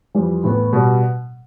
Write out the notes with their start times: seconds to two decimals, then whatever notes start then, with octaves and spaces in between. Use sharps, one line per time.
0.14 F2 E3 G3
0.44 A2 E3 B3
0.73 B2 G3